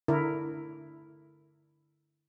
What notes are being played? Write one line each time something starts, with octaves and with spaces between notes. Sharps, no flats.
D3 E4 A#4